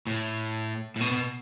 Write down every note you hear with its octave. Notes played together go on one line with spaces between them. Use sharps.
A2
A2
B2
B2